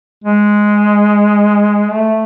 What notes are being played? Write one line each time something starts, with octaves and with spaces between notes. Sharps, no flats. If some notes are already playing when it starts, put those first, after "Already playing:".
G#3
A3